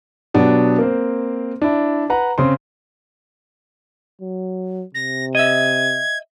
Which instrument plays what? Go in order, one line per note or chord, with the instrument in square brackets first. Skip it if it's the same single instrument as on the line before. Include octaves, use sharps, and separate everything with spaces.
[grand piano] B2 F#3 B3 D4 G4
A#3 C4 C5
D4 E4
B4 F#5 A#5
C#3 C4 C6
[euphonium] F#3
[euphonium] C3 [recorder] A#6
[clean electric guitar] D#5 E5 [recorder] G#6